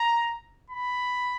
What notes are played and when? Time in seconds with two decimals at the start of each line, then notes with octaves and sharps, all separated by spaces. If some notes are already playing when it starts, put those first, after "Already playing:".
Already playing: A#5
0.70 B5